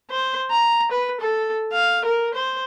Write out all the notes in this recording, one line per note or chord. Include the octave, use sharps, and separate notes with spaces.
C5
A#5
B4
A4
F5
A#4
C5